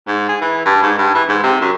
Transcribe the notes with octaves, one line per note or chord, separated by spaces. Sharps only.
G#2
G#4
E3
G2
G#2
G2
E3
G#2
C3
F#2